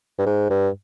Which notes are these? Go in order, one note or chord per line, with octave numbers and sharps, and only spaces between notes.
G2
G#2
G2